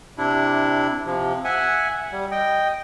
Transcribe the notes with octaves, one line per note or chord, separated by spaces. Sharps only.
C3 D4 E4
C3 F3
E5 F#5 G#5
G3
D#5 G5